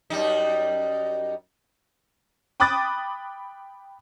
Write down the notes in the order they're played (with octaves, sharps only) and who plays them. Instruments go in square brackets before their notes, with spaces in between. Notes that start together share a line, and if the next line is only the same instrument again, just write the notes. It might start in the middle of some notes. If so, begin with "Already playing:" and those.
[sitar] F#2 G3 D#4
[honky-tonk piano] G5 B5 D6 D#6 F#6 A6